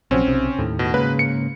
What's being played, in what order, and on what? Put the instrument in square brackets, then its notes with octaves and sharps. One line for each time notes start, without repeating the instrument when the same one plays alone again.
[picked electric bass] A#1 C3 F#3 [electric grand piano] C4 C#4
[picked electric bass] B1 C3
D#2 A2
[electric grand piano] B2
[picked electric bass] G#2 C#3 A#3 [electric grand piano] B4
[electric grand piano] C#7